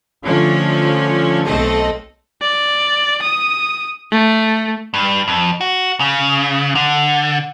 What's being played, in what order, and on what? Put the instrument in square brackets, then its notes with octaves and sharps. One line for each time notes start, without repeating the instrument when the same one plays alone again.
[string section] D3 F3 A3 C#4 D4
B1 A3 C4 A4 D#5
[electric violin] D5
D#6
A3
[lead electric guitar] G2
F2
F#4
C#3
D3